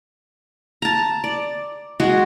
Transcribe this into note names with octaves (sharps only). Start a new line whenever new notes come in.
A5 A#5
D5
G#3 F#4 G#4